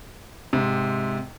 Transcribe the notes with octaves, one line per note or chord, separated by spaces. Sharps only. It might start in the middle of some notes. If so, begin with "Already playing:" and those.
G#2 C3